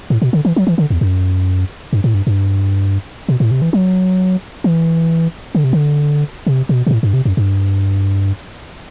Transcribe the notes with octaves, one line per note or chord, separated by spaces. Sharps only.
A2
B2
D3
E3
F#3
E3
D3
E2
F#2
G2
A2
G2
G2
B2
A2
C3
E3
F#3
E3
D3
C3
D3
C3
B2
B2
A2
G2
C3
F#2
G2